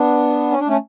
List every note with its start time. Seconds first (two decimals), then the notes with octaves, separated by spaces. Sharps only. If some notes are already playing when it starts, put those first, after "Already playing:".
Already playing: B3 D4
0.51 C#4
0.60 D4
0.67 A3 C#4